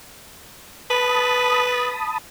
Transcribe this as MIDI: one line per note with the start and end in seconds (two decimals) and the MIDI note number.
0.90 1.92 71
0.90 2.18 81
0.90 2.18 83
0.90 2.18 87